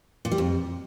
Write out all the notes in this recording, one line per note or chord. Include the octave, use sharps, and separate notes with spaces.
A#2
G3
F2